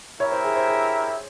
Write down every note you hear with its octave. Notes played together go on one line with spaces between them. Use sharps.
E4 G4 A#4 C#5 E5
C5
G#4
C5
G#4